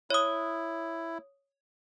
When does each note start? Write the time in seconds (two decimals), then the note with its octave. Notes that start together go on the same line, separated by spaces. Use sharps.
0.10 E4 C#5 D#6